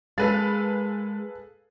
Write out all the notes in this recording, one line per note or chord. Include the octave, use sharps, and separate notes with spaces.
G#3 A#3 G#4 A4 B4 F5 A6